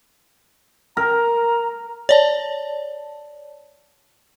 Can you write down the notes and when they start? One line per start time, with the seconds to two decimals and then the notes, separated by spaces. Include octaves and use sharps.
0.97 A#4 A#5
2.09 C#5 D5 A5